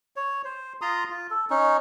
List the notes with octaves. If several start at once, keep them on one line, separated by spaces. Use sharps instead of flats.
C#5
C5
F4 A#5 C6 D#6
F4
A4
C#4 D#4